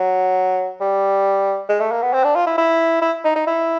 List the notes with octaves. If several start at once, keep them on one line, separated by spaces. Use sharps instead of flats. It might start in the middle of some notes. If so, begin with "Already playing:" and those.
Already playing: F#3
G3
G#3
A3
A#3
B3
C4
D4
F4
E4
E4
E4
D#4
D#4
E4